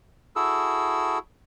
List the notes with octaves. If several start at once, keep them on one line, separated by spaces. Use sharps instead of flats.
E4 F#4 G#4 A4 E6